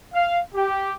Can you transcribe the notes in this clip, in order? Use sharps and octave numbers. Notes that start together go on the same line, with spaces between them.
F5
G4